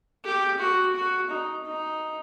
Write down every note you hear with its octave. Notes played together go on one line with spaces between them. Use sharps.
G4
F#4
F#4
D#4
D#4